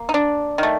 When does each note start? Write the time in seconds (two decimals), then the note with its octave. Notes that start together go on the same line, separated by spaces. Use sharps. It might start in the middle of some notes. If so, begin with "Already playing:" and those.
Already playing: A#3
0.09 D#4
0.14 D4
0.58 D#3 A3